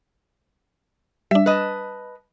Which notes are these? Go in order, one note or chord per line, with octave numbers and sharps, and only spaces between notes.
G3 D4 E5
B4 D#5 A5